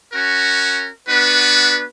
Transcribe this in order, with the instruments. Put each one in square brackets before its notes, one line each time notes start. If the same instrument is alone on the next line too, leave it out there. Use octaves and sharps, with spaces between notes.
[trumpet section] C#4 F#4 A#4
B3 D4 F#4 B4